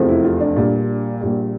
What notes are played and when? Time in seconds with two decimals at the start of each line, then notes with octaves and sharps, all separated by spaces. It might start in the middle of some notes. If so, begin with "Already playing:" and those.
Already playing: F1 E2 C3 F3
0.08 E4
0.24 F4
0.40 D4
0.56 A#1 A#2 G3
1.21 A#1 A#2 G3